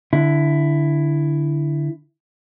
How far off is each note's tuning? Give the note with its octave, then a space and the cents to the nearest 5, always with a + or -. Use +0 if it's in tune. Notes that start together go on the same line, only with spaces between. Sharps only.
D3 +0 E4 +10